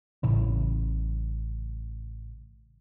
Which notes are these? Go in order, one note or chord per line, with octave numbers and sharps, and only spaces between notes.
A1 A2 C#3